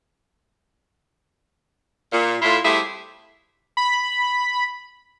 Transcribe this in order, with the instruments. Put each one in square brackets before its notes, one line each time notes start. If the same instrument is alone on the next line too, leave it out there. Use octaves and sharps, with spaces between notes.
[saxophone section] A#2
A2 E4 F4
G3 A3 C4 E4 G4 G#4
[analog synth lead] B5